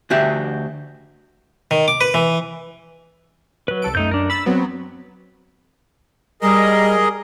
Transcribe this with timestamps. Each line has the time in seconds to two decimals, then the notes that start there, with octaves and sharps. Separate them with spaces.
0.10 D2 F#4 G4 E5
1.71 D#3
1.88 D6
2.01 B4
2.14 E3
3.68 F#3 B4
3.82 C2 A4 D7
3.95 F#2 A3 D#4 G6
4.11 D4 A#4
4.30 B5 E6 A6
4.46 F#3 B3 C4
6.42 G3 G#4 A#4 D#5